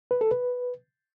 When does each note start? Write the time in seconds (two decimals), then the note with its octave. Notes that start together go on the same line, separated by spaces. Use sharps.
0.11 B4
0.21 A4
0.31 B4